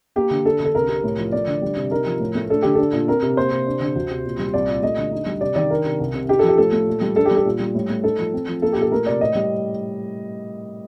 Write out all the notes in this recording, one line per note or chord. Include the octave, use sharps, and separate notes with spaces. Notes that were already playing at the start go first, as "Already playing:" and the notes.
A#3 G4
D3
D4 A4
D3 A4
C2 A#4
C3
A2
F3
A3 D5
D3
G3
C3
D#4 A#4
F3
A2
A3
D4 A4
D3 G4
D4 A4
A#2
C4 A#4
C3
A#3 C5
C3
D4
D3
D2
C3
A#2
G3
C2 D5
A#2
A3 D#5
D3
D#4
G3
C3 D5
D#3 D5
D4 A#4
C3
C2
C3
D#4 G4
A4
F3
G4
A2 A4
A3
A#2
G3
D4 A4
G4
G3
A4
A#2
G3
A2
A3
D#4 A4
F3
C4
F3
A#3 A4
G4
A#2
A4
A3 A#4
C3 D5
A2 D#5
G3